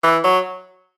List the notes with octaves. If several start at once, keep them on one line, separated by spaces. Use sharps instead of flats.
E3
F#3